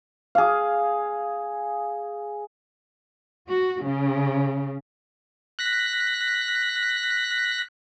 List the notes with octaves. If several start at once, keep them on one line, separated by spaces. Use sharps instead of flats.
G#4 F5
F#4
C#3
F#6 A#6 B6